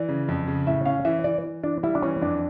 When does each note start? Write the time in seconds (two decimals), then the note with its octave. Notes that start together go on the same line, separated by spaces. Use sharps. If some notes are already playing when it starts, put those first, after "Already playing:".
Already playing: E3 D5
0.09 C#3
0.28 F2
0.48 C#3
0.67 A2 E5
0.85 C#4 F5
1.05 E3 E5
1.24 E3 D5
1.44 E3
1.64 E3 D4
1.83 G3 E4
1.95 D4
2.02 E3 C#4
2.21 F2 D4